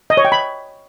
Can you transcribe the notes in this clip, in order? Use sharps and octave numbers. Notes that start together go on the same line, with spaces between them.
D#5
C#5
G5
B5